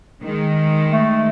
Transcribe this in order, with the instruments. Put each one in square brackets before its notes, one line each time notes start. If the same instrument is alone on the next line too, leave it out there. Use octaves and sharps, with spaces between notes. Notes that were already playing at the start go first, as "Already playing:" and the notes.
[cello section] D#3 G#3
[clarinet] A3